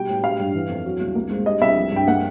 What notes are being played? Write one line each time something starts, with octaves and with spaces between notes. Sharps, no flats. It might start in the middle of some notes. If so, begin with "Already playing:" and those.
Already playing: B2 G3 G5
A2
G3 F5
G2
E3
F2
F#3
C2
A#3
G#2
G3 D#5
C2 E5
F3
G2 G5
A#3 F#5